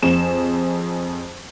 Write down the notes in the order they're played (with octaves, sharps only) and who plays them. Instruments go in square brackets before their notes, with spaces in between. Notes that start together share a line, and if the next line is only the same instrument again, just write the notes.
[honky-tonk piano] F2 G#4 E7